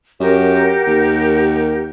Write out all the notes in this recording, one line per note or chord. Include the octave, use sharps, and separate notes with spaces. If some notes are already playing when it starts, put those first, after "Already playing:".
F#2 G4 A#4 F#5
D#2